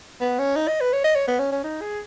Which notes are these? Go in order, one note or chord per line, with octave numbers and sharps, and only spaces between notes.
B3
C#4
D#4
D#5
B4
C#5
D#5
C#5
B3
C#4
C#4
D#4
G#4